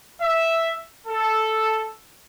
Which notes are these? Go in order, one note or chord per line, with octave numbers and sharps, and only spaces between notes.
E5
A4